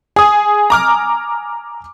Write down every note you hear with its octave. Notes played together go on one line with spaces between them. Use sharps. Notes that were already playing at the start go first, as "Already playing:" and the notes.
G#4 G#5 D#6
A#5 D6 F6